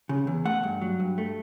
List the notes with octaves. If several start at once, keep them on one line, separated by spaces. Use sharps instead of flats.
C#3
E2
A3 F#5
G2
F#3
G2
A3